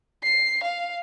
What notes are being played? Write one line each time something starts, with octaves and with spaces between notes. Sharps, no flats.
C7
F5